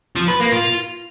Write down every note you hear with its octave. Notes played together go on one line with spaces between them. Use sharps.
F3
B4
A#3
F4